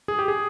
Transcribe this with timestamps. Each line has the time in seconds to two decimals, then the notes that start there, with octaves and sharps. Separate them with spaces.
0.08 G#4
0.19 G4
0.28 G#4